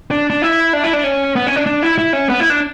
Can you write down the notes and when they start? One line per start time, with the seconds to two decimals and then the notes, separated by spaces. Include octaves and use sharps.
0.11 D4
0.30 D4
0.42 E4
0.73 D4
0.84 E4
0.93 D4
1.04 C#4
1.36 B3
1.46 C#4
1.56 D4
1.66 D4
1.83 E4
1.98 E4
2.13 C#4
2.29 B3
2.40 E4
2.50 D4